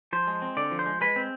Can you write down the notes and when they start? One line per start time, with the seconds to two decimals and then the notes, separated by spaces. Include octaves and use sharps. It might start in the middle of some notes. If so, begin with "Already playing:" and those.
0.13 F3 C5
0.27 G#3
0.42 C4
0.57 D3 D5
0.71 F3
0.79 C5
0.86 G#3
1.01 G#3 B4
1.16 C4